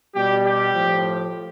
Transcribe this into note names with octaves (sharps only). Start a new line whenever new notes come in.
B2 G3 G4
G4
A2 F3